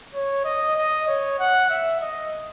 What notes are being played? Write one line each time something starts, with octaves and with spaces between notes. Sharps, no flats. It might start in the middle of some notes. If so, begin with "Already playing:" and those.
C#5
D#5
D#5
C#5
F#5
E5
D#5